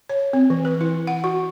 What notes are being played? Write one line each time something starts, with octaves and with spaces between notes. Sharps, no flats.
C#5
C4
E3
B4
E4
F#5
F#4